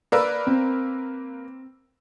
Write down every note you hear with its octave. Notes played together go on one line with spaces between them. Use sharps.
A#3 A#4 B4 D5 E6
C4